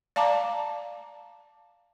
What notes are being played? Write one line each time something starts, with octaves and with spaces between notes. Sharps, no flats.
D5 F5 A5 A#5 D6